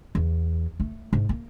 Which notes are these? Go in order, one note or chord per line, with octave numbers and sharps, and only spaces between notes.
E2
A3
G#2
A#3